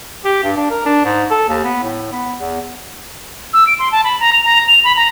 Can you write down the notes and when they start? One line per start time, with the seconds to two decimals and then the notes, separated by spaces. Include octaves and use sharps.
0.25 G4
0.44 G2
0.57 D4
0.70 A#4
0.86 D4
1.05 G#2
1.31 A4
1.49 D#2
1.64 B3
1.83 A2
2.12 B3
2.39 E2
3.53 E6
3.67 D7
3.79 C6
3.92 A5
4.04 B5
4.20 A#5
4.33 F7
4.45 A#5
4.68 F7
4.84 B5
4.97 A#5